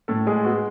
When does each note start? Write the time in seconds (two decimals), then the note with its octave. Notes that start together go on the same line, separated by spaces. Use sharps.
0.08 A2 A4
0.27 G#3 G#4
0.44 B3 F#4